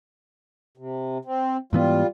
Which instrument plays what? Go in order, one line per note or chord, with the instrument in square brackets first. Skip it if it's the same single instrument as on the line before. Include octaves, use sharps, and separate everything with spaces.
[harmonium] C3
C4
[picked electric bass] G#2 E3 B3 [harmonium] G3 F4